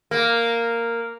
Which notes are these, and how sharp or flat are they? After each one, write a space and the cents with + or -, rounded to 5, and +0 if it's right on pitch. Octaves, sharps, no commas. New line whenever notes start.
A#3 -5